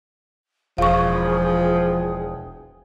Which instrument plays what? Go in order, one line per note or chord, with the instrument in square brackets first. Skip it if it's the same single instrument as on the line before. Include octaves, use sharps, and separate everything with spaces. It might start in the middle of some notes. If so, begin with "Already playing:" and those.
[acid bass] E1 [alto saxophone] F3 [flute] G#4 [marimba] F5 C#6